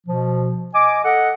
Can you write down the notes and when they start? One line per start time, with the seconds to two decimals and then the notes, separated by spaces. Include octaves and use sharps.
0.07 B2 F3
0.74 D#5 G#5 D6
1.04 A4 D#5 F#5